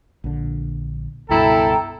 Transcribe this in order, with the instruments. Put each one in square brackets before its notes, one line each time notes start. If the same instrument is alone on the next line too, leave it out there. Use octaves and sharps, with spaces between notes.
[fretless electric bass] A#1 D3
[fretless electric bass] C#2 G2 B2 [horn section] E4 A4 [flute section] G5 A#5